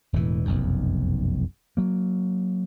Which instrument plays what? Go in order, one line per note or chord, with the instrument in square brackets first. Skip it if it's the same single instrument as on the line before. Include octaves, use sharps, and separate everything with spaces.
[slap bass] E1 A2 E3
F1 B1 F#2
F#3 A#3